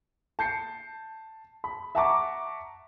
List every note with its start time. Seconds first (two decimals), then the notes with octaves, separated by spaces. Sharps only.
0.39 A5 G6 C7 C#7
1.64 B5
1.95 E5 F#5 A5 A#5 C#6 D6